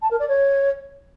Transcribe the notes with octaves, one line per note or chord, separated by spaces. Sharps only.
A5
A#4
D5
C#5